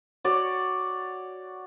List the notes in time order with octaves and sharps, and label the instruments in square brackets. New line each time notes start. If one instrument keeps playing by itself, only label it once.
[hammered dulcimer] F#4 C#5 D5